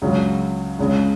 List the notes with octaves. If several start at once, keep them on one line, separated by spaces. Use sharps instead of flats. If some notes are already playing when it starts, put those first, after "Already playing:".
C#2 C#3 F#3
C#2 C#3 G#3